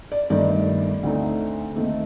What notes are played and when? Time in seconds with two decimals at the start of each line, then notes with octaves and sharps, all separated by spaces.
0.12 D5
0.30 G1 G2 D#3 A3 D5
1.03 D2 D3 A3 C4 D#4
1.76 D#2 D#3 A3 C4